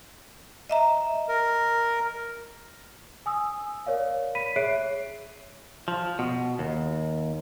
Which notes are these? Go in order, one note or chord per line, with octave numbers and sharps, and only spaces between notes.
D#5 E5 A#5
A#4
G#5 D#6 E6
A#4 C#5 D5 F5
B5 B6 D#7
G#4 C#5 E5 F#6 C7 D7
F3
B2
D#2